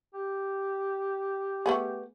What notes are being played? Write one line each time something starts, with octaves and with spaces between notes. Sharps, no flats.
G4
A3 B3 G#4